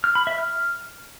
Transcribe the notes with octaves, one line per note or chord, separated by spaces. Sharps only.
F6
B5
E5
F6